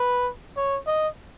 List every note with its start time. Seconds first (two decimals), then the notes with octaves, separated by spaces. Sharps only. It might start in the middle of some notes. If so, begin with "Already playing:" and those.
Already playing: B4
0.57 C#5
0.87 D#5